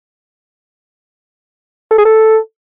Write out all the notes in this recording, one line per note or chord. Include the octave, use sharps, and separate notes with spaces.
A4
G#4
A4